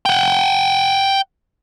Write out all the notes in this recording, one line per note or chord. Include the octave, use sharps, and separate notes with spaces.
F#5 G5